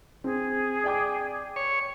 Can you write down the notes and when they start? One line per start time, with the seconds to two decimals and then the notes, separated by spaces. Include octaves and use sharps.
0.24 C4 G#4
0.84 D5 G5 D6
1.56 C#5